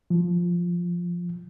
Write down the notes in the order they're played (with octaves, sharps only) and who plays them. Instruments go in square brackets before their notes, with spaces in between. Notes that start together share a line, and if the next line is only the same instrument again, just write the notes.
[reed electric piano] F3